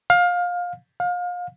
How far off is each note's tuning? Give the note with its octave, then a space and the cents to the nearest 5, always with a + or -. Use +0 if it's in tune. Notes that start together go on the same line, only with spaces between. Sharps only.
F5 +25
F5 +35